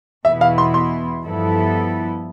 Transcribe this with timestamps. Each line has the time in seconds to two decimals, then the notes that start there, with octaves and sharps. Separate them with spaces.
0.25 E2 B2 B3 E4 E5
0.41 F5
0.58 C6
0.74 C6
1.24 G2 F3 B3 E4 A4